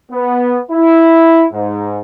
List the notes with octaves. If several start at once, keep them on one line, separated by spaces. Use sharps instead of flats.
B3
E4
G#2